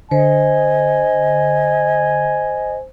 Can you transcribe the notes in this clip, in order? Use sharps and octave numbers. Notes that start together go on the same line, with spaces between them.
D3 C5 D#5 G#5